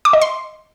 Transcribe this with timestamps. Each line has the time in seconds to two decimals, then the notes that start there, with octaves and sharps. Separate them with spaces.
0.05 D6
0.13 D#5
0.22 C6